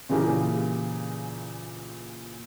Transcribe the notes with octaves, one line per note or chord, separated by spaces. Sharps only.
A#2 C#3 E3 G4 G#4 A#4